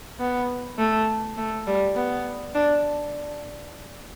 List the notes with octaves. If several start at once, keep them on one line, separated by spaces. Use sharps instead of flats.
B3
A3
A3
G3
B3
D4